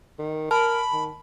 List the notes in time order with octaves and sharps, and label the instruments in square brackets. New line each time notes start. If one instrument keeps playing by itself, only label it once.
[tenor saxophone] D#3
[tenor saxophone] A#4 [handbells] A5 [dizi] B5
[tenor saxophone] D#3